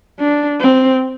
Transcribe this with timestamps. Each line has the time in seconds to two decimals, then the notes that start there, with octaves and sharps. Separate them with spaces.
0.20 D4
0.60 C4